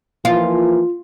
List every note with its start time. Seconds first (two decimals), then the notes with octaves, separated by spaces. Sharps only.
0.25 E3 F3 A#3 F4